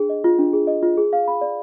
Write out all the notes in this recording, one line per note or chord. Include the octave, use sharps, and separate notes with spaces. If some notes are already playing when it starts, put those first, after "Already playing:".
Already playing: D4 G#4
D#5
F4
D4
G#4
D#5
F4
G#4
F5
B5
D5